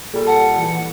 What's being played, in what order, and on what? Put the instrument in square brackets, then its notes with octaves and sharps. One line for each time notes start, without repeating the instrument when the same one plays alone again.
[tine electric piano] A#2 G3 [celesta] G#4 [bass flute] A4
[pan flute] F#5 [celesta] A5
[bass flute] E3